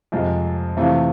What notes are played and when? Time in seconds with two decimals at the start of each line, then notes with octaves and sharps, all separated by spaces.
0.12 F2 C3 F3 G#3
0.77 C3 E3 A3 C4 F4